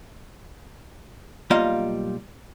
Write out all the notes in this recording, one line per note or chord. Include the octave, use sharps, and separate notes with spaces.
B1 G3 A#3 F4 D#5 F5